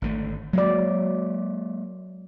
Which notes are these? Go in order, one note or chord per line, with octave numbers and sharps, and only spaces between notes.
G#1 D3 A3
F#3 G#3 A#3 D5